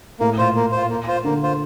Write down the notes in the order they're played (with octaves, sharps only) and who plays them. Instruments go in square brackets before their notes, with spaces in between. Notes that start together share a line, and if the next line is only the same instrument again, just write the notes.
[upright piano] A2 [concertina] A#3
[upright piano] A#2 [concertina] F4 C5
[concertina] A#3
F4 C5
A#3
F4 C5
[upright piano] D3 [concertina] A#3
[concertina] F4 C5